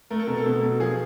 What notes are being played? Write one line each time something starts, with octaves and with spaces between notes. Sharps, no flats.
A3 A#4
A4
B2 A#4
A4
B2
F#3
F3 G#4